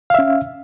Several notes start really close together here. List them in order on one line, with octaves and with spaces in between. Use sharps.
F5 E5 C#4